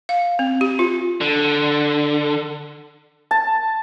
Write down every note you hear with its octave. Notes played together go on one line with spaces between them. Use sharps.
F5
C4
G4
F4
D3
A5